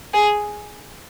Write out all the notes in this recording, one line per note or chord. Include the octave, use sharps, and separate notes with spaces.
G#4